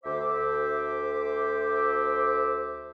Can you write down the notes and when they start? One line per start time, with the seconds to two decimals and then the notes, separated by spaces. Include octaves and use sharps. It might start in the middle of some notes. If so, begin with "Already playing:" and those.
0.04 D2 C5 E5 D6